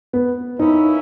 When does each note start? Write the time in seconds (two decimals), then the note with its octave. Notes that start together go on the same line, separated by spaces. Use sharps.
0.13 B3
0.59 A#3 C#4 D#4 E4